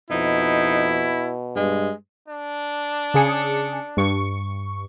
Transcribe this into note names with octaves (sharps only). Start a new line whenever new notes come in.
F2 B2 D#4 E4
G2 G#3
D4
C#3 G#4 C#7
G2 C#6